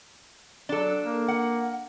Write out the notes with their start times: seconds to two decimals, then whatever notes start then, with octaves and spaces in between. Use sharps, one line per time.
0.69 F#3 D4 A4
1.04 A#3
1.28 F#5